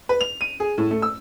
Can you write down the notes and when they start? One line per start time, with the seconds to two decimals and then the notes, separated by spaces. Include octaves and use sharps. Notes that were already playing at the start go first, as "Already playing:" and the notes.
0.09 B4
0.21 F7
0.41 D#7
0.60 G#4
0.78 A2
0.91 A3
1.02 E6